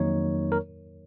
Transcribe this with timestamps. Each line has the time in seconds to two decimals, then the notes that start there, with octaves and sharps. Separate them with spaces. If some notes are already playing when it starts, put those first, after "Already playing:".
Already playing: F2 D#3 F#3 A#3 D#4 C#5
0.52 A#4